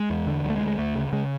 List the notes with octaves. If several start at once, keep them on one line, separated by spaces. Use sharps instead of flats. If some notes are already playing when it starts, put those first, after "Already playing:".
Already playing: G#3
E2
D3
D2 F#3
A3
G#3
D2
G#3
D2 A3
C#3
C#3 G#3